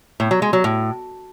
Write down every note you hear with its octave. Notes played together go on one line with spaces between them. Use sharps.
A2
F#3
G#3
F#3
A2